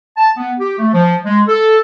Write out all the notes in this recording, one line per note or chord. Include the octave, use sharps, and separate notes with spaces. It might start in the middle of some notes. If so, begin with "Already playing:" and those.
A5
B3
G4
A3
F3
G#3
A4